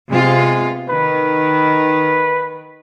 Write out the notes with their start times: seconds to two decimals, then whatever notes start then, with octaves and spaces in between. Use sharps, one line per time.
0.11 C3 G#3 B3 F4
0.89 D#3 B4